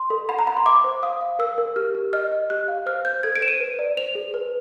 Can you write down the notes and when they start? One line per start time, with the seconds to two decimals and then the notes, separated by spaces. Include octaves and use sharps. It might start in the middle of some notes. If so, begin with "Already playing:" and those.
Already playing: C6
0.10 A4
0.29 F#5 B5
0.39 A#5
0.47 F#5 B5
0.57 C6
0.66 E5 D6
0.84 C5
1.03 F5 D#6
1.21 F5
1.39 A#4 E6
1.58 A#4
1.76 G4 F6
1.95 G4
2.13 D#5 F6
2.32 D#5
2.50 G4 F#6
2.68 F5
2.86 C5 F6
3.05 C5 G6
3.23 A4 G#6
3.36 D7
3.42 C5 E7
3.48 D#7
3.60 B4
3.79 D5
3.97 C5 F7
4.15 G#4
4.34 B4